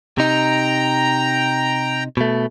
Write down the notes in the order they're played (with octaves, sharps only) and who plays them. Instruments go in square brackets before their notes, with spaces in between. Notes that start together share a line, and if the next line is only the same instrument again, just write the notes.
[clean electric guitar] C3 D#4 [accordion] G5 A#5
[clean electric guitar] B2 A3